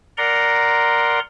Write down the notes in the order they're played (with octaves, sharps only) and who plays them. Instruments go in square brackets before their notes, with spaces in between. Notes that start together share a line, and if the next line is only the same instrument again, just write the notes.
[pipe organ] A#4 D5 F#5 A#5 C6